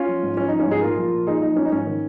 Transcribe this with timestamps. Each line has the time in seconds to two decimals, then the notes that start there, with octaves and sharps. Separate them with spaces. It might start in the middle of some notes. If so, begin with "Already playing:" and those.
Already playing: C#4 F4
0.08 F3
0.23 G#2
0.37 F3 C#4
0.48 F3 D#4
0.59 C#4 F4
0.67 G#2 D#4 G#4
0.82 A#2 F4 A#4
0.98 F3
1.12 A#2
1.27 A#2 D#4 G#4
1.42 F3 D#4
1.56 F3 C#4
1.65 D#4
1.72 G#2 C#4
1.86 D#3